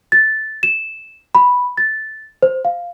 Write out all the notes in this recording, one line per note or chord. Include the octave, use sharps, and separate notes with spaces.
A6
E7
B5
A6
C5
F5